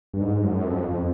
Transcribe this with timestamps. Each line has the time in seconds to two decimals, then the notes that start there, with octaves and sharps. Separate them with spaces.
0.14 G2
0.21 G#2
0.44 F#2
0.66 F2
0.88 F2